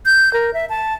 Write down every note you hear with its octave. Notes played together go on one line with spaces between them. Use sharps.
G6
A#4
E5
A5